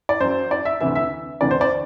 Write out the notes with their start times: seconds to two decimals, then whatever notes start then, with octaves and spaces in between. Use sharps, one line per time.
0.09 D5
0.20 F#2 F#3 C5
0.51 D5
0.65 E5
0.81 D2 C3 E3 E5
0.95 E5
1.41 D2 C3 E3 D5
1.51 C5
1.61 D5